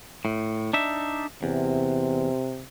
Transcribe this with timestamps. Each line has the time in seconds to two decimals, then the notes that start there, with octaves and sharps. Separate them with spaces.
0.25 A2
0.73 D4 D#4 E5
1.43 E2 C3